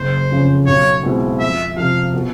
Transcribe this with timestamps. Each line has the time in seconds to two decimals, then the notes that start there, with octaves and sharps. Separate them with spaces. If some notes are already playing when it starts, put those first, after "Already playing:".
Already playing: F#1 C5
0.31 F2 C#3
0.66 B1 C#5
1.03 B2 G#3 C4 E4
1.40 F2 E5
1.76 C3 F3 F5
2.14 B2